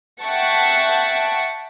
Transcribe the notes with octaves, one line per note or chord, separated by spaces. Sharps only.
E5 F#5 G5 A5 C#6